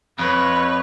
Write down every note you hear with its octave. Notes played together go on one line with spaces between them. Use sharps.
F2 B4 C#5